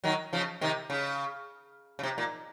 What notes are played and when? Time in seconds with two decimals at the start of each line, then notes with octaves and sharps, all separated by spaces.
0.04 D#3 F#3
0.33 C#3 F3
0.61 C3 D#3
0.90 C#3
1.99 C#3
2.03 C3
2.18 A#2